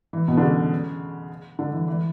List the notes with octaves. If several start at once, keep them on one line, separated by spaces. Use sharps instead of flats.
E3
B2
D3
C#3
D3
E3
E3